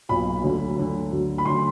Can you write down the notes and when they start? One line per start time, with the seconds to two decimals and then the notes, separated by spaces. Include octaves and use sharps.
0.09 B1 A#2 F#3 B5
0.43 D2 D3 F#3
0.78 D2 D3 F#3
1.12 D2 D3 F#3
1.38 B5
1.45 D2 D3 F#3 C6